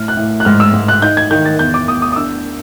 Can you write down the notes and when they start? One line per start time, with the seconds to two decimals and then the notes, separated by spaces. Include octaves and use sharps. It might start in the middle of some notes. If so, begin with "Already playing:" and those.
Already playing: A2 F6
0.08 F#6
0.17 A2
0.40 F#6
0.45 G#2 F6
0.60 E6
0.74 G#2
0.88 F#6
1.02 D#4 G6
1.17 G#6
1.31 D#3 G6
1.46 A6
1.59 E2 G6
1.74 D6
1.87 E2 D#6
2.02 D#6
2.12 D#6
2.16 D4 E6